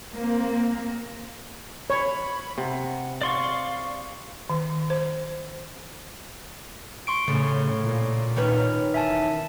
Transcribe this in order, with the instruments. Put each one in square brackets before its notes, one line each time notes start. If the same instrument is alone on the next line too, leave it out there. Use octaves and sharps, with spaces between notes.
[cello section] A#3 C4
[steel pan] C#5 [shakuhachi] B5
[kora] C3 [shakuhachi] F#5
[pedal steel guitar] D5 C6 C#6 [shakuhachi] F5
[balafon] D#3
C5
[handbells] C6 C#6 D7
[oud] A2 [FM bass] C#3
[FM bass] A#2
[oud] D#3 C#4 B4
[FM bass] E1 [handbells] E5 G#5 A5